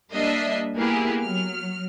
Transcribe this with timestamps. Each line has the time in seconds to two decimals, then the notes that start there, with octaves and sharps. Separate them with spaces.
0.12 G3 A#3 D4 D#5 E5 C7
0.76 A#3 B3 E4 G4 G#4
1.22 F#3 F6